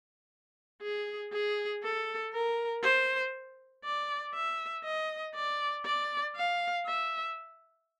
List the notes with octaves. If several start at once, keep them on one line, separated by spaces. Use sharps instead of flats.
G#4
G#4
A4
A#4
C5
D5
E5
D#5
D5
D5
F5
E5